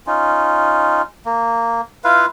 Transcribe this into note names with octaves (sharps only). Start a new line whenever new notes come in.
C#4 D#4 F4
A#3
E4 F4 B4 F5